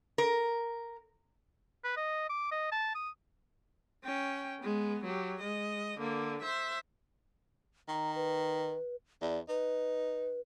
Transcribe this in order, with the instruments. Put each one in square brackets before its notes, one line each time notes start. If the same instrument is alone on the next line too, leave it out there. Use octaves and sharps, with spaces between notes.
[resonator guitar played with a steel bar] A#4
[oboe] B4
D#5
D6
D#5
A5
D#6
[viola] C#4 G5
G#3 B3
F#3 G4
G#3 D#5
D3 A#3
C5 E5
[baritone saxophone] D#3 [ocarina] A#5
[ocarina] B4
[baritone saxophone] E2 [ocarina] D5
[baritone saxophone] D#4 [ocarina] B4